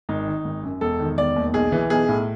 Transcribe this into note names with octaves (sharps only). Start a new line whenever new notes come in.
G#1 D#4
D#3
G#1
F#2
E1 A4
D#3
E1 D5
D#2
B1 G#4
E3
B1 G#4
A2